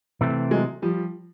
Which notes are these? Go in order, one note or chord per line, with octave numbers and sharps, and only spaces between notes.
C3 E3 A3 C4
F#3 G#3
F3 G3